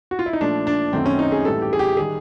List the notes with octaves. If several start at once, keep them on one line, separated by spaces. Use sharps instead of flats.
F#4
F4
E4
D#4
A#2 F3 A3 D4
D4
F#2 D#3 F#3 A3 C4
C#4
D#4
G#4
A2 E3 G3 A4
G4
G#4
G4
D#3 G3 G#4